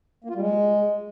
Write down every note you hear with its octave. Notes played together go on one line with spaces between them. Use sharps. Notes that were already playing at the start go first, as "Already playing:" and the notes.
A#3
F4
G3
G#3